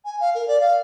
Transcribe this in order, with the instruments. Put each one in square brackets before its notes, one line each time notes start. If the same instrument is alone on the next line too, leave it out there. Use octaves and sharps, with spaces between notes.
[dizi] G#5
F5
A#4
D5
F5